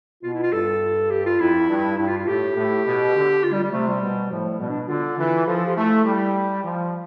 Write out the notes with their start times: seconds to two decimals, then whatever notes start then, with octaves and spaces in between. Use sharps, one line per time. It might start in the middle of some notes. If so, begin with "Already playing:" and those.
0.23 B2 F4
0.33 E4
0.43 F4
0.52 G2 A4
1.10 G4
1.26 F4
1.40 F2 E4
1.69 G2
1.97 G2 E4
2.07 F4
2.17 F4
2.27 A2 G4
2.56 A2
2.86 B2
3.15 D3
3.44 F4
3.53 G3
3.63 G3
3.72 C3 A3
3.87 G3
4.01 B2
4.31 A2 F3
4.59 B2 G3
4.69 D4
4.88 D3 F4
5.18 E3
5.46 F3 A4
5.57 A4
5.66 G4
5.76 A3 E4
6.05 G3
6.63 F3